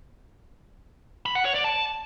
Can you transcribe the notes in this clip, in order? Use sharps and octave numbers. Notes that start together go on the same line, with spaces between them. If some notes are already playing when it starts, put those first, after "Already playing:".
B5
F#5
C#5
D5
A5